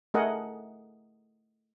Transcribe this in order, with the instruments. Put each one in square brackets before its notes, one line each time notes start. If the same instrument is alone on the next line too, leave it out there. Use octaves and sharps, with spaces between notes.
[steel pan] A3 G#4 A#4 D#5 F#5